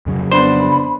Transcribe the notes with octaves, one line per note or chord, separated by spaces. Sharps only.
F2 C#3 F#3
B3 D4 C5 B5